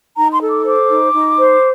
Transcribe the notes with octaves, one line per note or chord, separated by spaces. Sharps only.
D#4 A#5
C6
A4
D6
C5 D6
D#4
D#4
C5